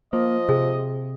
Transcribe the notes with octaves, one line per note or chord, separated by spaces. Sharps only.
F3 A#3 D#5
C3 G#4